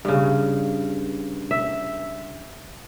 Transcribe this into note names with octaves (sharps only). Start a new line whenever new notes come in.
G2 C#3
E5